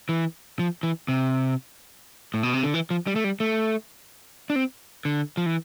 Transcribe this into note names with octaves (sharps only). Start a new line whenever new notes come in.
E3
F3
E3
C3
A2
B2
C3
D3
E3
F3
G3
A3
G3
A3
D4
C4
D3
F3
E3